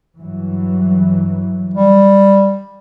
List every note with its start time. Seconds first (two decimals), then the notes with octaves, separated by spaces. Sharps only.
0.20 G2 E3 F#3
1.74 G3